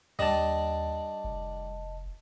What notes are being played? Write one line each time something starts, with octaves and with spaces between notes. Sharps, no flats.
D#2 G3 D4 D#5 A5
F1